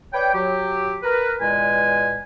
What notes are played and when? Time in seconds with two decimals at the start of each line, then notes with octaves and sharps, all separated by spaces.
0.13 B4 C#5 D5 G5
0.34 F#3 G4
1.03 A#4 B4
1.41 E2 A#2 G#3 B4 G#5